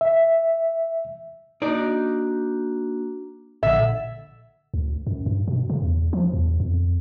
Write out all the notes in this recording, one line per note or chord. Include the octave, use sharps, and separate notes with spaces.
E5
A#3 D4 D#4 F#4 D5
A#1 A#2 D3 A4 E5 F#5
D2
F#2
G2
B2
C#3
E2
F3
E2
F2